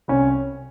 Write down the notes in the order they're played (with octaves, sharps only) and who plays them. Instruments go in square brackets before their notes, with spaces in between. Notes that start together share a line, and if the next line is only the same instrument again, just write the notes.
[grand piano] C2 C#4